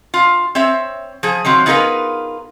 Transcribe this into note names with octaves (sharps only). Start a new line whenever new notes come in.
F4
C4 C#5 E5
F3 G#4
D#3 F3 F#3 C4
B3 D#4 F4 G#4 A#4 B4